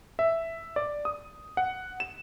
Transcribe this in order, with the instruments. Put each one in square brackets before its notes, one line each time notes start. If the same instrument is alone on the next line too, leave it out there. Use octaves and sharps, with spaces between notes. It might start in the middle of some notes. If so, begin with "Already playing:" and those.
[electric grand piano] E5
D5
D#6
F#5
E7